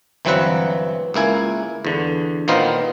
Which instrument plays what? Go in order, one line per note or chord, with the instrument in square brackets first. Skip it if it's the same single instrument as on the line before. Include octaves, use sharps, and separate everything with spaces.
[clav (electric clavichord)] G1 E3 F#3 C4 B4 F#5
C#2 A#3 E4 G#5
E2 D3
A#2 D#3 A#3 B3 C5 F5